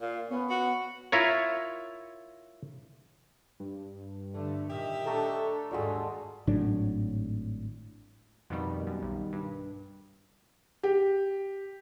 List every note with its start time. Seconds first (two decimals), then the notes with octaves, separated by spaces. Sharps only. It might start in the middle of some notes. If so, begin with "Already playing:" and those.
0.01 A#2 F5
0.30 B3 C#4
0.49 F#4
1.12 E4 F4 A#4 C#5
3.60 G2
4.34 D3 A3
4.69 A#2 D#3 G4 D#5 E5
5.05 A3 D4 A4 A#5 E6
5.71 D#2 G#2 D3 G3 G#3 F4 F#4 D5
6.47 G#1 A2 F#3 D4
8.50 F2 B2 D#3 G3
8.87 F#2
9.02 B1
9.33 G2
10.83 G4